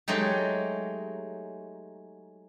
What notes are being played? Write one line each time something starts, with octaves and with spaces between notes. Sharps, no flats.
F#3 G#3 A3 D#4 G4